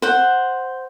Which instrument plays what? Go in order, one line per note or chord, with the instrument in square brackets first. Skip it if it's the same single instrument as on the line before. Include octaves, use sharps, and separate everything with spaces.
[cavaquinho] C5 F#5